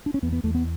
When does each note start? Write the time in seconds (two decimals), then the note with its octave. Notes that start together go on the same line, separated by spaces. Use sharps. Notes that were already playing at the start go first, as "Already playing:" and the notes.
0.06 D4
0.14 C#4
0.22 E2 B3
0.33 B3
0.44 E2 A3
0.55 B3